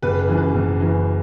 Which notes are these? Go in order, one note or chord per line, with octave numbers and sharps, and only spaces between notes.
F#1 B4
B4
F#2 E3
B4
F#1
F#2 E3